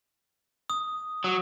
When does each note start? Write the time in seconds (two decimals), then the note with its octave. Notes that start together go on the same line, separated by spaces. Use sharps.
0.70 D#6
1.24 F#3